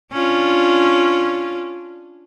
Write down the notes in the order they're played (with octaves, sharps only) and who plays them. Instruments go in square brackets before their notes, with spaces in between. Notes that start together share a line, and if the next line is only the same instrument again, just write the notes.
[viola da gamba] C#4 D4 F4